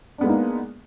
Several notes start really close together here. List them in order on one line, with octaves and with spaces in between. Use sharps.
D4 B3 G#3 A#3 D#4